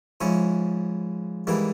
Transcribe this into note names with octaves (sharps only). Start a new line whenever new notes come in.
G#2 F3 G#3 C#4 E4
G#2 E3 G3 A#3 E4